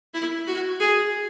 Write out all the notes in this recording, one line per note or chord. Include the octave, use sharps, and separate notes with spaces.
E4
F#4
G#4